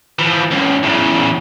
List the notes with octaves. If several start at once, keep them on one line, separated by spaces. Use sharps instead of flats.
E3 F3
C#2 F#2
E2 C#3